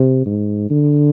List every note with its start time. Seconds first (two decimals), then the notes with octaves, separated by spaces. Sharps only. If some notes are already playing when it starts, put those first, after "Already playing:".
Already playing: C3
0.26 G#2
0.70 D3